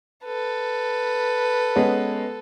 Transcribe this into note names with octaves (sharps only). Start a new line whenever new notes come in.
A4 B4
G#3 B3 C#4